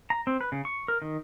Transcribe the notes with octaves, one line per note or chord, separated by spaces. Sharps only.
A#5
C4
B4
C#3
C#6
A#4
D#3